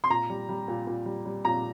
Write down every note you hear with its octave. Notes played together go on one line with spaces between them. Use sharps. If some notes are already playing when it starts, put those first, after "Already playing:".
C6
A#2 A#5
G3
G3
A#2
A#2
G3
G3
A#2 A#5